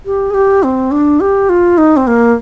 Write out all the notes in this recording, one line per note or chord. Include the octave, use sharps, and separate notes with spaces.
G4
G#4
G4
C4
D4
G4
F4
D#4
C4
A#3